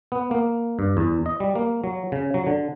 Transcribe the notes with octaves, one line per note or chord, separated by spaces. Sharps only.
B3
A#3
G2
E2
D#5
G3
A#3
F#3
C#3
F#3
D3